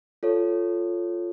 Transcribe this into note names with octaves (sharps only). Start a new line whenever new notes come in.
F4 A4 C#5